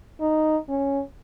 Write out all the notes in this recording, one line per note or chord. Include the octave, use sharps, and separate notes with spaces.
D#4
C#4